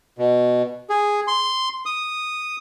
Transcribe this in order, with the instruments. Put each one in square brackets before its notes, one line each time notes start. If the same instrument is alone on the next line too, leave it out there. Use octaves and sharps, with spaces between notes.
[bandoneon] B2
G#4
C6
D#6